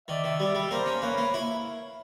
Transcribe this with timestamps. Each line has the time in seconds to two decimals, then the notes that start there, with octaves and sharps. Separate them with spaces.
0.08 D#3 D5 E5
0.24 D#3
0.40 G3 D5 E5
0.55 G3
0.70 A#3 A#4 C5
0.86 C#4
1.02 A#3 B4 C#5
1.17 A#3
1.34 E4